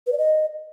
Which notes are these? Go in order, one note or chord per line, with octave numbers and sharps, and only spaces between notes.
B4
D5
D#5